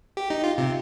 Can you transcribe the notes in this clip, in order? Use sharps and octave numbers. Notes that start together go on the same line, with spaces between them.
G4
D#4
F4
C3